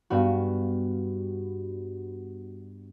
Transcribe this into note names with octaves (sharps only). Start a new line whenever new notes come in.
G2 B3 F#4